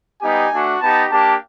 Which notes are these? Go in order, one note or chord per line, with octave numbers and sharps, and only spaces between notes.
G3 B3 D#4 G4 G#5
A3 D4 F#4
B3 D#4 G4 A5
A#3 D4 G4 A5